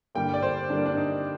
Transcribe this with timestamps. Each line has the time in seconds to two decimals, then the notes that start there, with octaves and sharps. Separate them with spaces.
0.15 G2 D3 G3 A#3 G5
0.34 D5
0.42 C5
0.70 G2 D3 G3 A#3 D4
0.86 D4
0.97 D#4